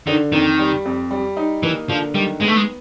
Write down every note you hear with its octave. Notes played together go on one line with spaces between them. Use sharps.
D3 D#3
F2 D#3
G3
F2
G3
D#4
E3 A#3
D3 F3
D#3 G3
G#3 B3
A3
G#3